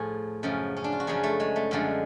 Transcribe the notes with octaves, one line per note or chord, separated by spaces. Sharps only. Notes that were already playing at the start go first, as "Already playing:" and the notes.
Already playing: A2 F3 G#4
F#2 C#3 F3
C#4
D4
F4
F#4
F#2 C#3 F3 G#4
A3
G#3
A3
F#2 D3 F3 G#3